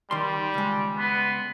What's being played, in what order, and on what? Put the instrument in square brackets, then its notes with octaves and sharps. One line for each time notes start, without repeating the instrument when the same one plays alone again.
[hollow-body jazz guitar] D#3 C6 [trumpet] G3
[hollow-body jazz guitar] C#2 G#3
[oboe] B3 [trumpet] C6